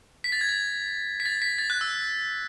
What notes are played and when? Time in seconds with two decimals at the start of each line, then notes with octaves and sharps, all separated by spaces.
0.24 B6
0.32 A6
0.41 G#6
0.49 A6
1.20 B6
1.26 A6
1.42 B6
1.58 A6
1.70 F#6
1.81 E6